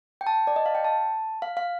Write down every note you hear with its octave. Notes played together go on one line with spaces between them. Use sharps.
G5
A5
D5
D#5
F5
G5
A5
F5
F5